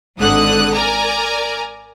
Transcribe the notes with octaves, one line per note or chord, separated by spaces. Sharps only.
G#1 G#2 D3 F#5 D#6 F#6
A#4 D5 G#5 A#5